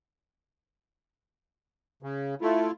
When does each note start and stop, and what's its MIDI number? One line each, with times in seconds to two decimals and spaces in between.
2.03 2.35 49
2.41 2.67 57
2.41 2.71 64
2.41 2.71 65